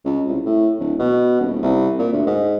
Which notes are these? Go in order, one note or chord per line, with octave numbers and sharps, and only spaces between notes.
C#2
C2
A2
D1
B2
D#1
C2
A#2
D2
G#2